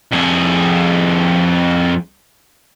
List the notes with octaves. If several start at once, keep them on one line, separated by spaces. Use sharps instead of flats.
F2 G#4